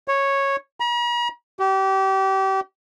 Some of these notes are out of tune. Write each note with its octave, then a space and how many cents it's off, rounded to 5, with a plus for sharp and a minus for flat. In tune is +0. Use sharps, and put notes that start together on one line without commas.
C#5 -10
A#5 +45
G4 -30